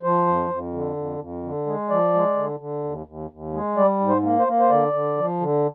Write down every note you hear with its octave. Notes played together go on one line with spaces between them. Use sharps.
F3 C5
F2
F2
D3
F2
F2
D3
G#3
F3 D5
G#3
D3
D3
D#2
D#2
D#2
G#3
G3 D5
G#2
C5
A#3
C5
A#3
C5
D3 D5
D3
F3
D3